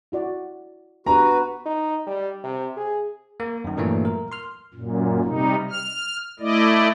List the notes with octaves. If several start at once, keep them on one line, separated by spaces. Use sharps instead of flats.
E4 F#4 D5
B3 D4 F#4 G4 B4 A#5
D#4
G3
C3
G#4
A#3
F#2 D#3
G2 A#2 E3 F#3 A3 A#3
A#4
C6 F6
F#2 A#2
C3 G3 D#4
F6
A3 E4 D5 D#5